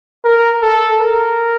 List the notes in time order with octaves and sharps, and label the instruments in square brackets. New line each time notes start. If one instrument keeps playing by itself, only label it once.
[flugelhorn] A#4
A4
A#4